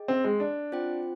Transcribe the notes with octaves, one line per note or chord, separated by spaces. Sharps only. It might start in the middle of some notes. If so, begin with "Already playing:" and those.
Already playing: G#4 D#5 G5
C4
G#3
D4
C4 F4 C5 G5